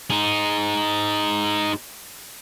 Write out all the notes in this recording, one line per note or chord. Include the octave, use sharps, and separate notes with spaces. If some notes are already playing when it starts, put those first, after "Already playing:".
D#4 G#4